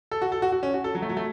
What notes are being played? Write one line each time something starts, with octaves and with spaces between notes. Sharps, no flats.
A4
F#4
A4
F#4
F#4
C#4
F#4
A4
F#3
A3
F#3
A3